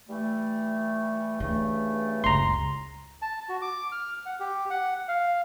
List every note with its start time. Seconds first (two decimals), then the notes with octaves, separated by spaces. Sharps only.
0.08 E3 G3 A3
1.40 G2 C#3 E3 A3
2.24 F#1 C#2 A#5 C6
3.22 A5
3.49 F#4
3.62 D6
3.92 F6
4.26 F#5
4.40 G4
4.70 F#5
5.08 F5